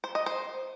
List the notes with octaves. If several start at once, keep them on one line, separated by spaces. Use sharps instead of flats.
C5
D#5
C5